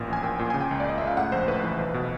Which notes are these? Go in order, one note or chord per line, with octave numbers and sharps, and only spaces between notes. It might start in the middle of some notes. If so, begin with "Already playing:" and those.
Already playing: A1 A#2
A#1 G#5
A#2 G5
A#2 G5
C#3 G#5
G5
C#2
D5
C#2 D#5
C#2 E5
F5
A2 F#5
A#1 C5
A2 B4
E3
B1
B2